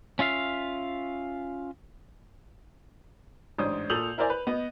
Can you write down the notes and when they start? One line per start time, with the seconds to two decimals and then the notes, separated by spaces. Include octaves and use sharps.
0.19 C#4 F4 E5 F5
3.58 A1 G#2 D4 C5 C#5 D#6
3.90 A#2 A4 D#6 G6 F7 F#7
4.18 E4 A#4 C5 D5 G#5
4.30 B4
4.47 B3 D#5